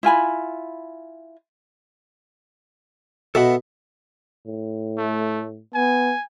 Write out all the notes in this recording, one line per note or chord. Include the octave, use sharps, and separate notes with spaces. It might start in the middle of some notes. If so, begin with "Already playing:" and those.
E4 F4 G#5 B5
B2 A4 E5 F#5
A2
A3
B3 G#5